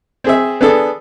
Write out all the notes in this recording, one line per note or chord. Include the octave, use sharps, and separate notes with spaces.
C4 G#4 E5
B3 D4 G#4 A4